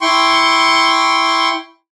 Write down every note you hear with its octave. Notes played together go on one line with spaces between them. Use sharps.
E4 G5 C6 C#6